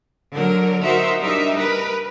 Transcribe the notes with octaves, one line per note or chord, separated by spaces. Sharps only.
D3 F#3 A#4
D#4 F#4 A#4 C5 E5
G3 D4 D#4 A#4 E5
A#4 B4